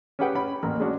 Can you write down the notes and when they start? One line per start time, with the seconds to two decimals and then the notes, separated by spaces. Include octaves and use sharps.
0.19 C#4 G4 G#4 B4 F#5 G5
0.35 C#4 B5
0.63 A1 A#3 A#5
0.80 G#3 C#4 D4 F#4